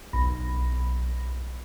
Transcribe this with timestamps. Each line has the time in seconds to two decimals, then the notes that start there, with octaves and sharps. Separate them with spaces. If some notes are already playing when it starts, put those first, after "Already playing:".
0.13 B1 B5 A#6